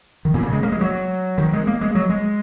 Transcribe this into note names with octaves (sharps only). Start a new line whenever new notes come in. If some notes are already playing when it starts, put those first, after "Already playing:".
D#3
A#2
C#3
G#3
A#3
G#3
F#3
D#3
G#3
A#3
G#3
F#3
G#3